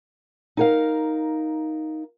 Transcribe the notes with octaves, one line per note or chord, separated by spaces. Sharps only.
D#4 A#4 F5